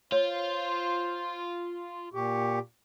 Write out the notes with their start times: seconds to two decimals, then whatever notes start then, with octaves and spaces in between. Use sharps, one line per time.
0.12 F4 C5 C#5
2.14 A#2 G4 C#6